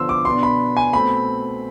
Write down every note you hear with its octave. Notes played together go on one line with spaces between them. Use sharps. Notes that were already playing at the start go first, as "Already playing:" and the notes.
Already playing: D3 F3 B3 D4 C6 E6
D6
B2 B3 D4 C6
B5
G#5
B2 A3 C4 B5